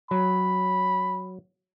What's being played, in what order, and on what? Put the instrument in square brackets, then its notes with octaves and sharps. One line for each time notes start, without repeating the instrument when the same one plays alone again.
[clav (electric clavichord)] F#3 [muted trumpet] B5